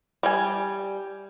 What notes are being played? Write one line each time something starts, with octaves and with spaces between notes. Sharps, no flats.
G3 G5 G#5